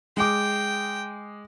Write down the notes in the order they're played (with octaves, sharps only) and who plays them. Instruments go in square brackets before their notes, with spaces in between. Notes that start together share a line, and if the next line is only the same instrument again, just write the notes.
[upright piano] G#3 D6 [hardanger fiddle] G5